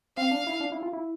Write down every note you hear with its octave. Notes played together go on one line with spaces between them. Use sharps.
C4 F5
D4
E4
D4
E4
F4
E4